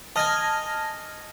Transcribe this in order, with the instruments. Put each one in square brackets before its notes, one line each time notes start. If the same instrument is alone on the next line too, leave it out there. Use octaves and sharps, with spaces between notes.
[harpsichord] D#5 G#5 [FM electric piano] A5 F6 A#6